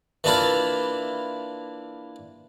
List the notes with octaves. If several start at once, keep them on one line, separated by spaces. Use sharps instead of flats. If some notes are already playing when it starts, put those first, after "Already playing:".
E3 A#3 D4 E4 F4